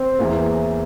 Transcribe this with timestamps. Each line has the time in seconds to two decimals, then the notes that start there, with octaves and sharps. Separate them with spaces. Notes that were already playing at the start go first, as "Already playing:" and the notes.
Already playing: C4
0.19 E2 E3 A#3